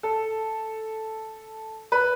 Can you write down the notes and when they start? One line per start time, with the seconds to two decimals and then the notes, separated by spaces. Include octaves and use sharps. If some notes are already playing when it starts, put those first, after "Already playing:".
0.03 A4
1.92 B4